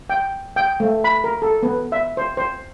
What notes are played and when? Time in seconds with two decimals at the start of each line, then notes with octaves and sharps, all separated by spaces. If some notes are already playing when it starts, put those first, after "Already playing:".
0.10 G5
0.56 G5
0.80 A3
1.04 B5
1.24 A#4
1.42 A4
1.63 B3
1.92 E5
2.17 C5
2.37 C5